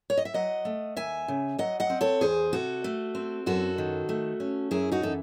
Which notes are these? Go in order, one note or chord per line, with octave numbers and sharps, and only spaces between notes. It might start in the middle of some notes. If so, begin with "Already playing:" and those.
C#5
D#5
E5
F#3 D#5 F#5
A3
D#2 E5 G#5
C#3
F#3 D#5 F#5
D#5 F#5
C4
A4 C#5
E2 G#4 C5
C3 F#4 A4
A3
C4
F#2 F#4 A4
D#3
A3
C#4
F#2 E4 G#4
D#4 F#4
E3 A4